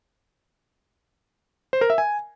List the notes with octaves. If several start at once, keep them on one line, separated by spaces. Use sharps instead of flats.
C5
A#4
E5
G#5